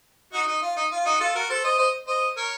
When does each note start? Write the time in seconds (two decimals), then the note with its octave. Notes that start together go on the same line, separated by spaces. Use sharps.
0.33 D#4 F#4
0.47 D#4
0.62 F4
0.76 D#4
0.92 F4
1.05 D#4 F#4
1.20 F4 A4
1.35 F#4 A#4
1.49 A4 C5
1.64 C5 D#5
1.78 C5 D#5
2.07 C5 D#5
2.37 A#4 C#5